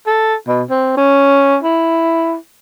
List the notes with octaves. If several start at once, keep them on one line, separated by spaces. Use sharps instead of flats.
A4
B2
C4
C#4
E4